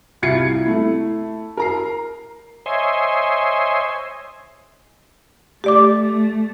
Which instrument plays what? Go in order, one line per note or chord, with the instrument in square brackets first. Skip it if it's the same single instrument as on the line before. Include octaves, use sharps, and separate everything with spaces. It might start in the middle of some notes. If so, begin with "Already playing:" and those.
[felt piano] C2 E4 F4 G#6 C7 C#7
A3 E4
A#4 A#5 C7
[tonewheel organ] C5 C#5 D#5 E5 G#5 C6
[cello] A3 [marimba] G4 D5 D6